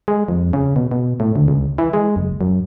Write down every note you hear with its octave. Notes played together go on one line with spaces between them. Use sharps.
G#3
F2
C#3
B2
B2
A2
D2
C#2
E3
G#3
F#1
F#2